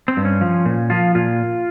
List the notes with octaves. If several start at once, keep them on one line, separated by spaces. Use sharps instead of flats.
C4
G2
C#4
F3
A#2
F3 F4
A#2 F4